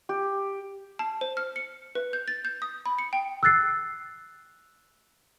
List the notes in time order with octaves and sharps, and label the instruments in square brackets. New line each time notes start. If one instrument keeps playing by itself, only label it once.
[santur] G4
[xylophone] A5
C5
F6
C#7
B4
G6
A6
G6
D#6
B5
C#7
G5
[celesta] E6 F#6 A6 C7